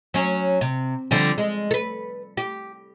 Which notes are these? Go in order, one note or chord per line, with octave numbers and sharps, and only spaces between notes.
F#3 C#4
C3
D3 F3 G3
G#3
A4 B4
G4